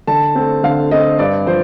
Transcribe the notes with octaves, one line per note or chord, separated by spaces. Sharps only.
D3 A5
A3 C4
D3 F5
A3 C4 D#5
G2 D5
F3 C5